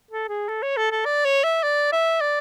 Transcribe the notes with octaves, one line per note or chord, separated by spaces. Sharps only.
A4
G#4
A4
C#5
A4
A4
D5
C#5
E5
D5
E5
D5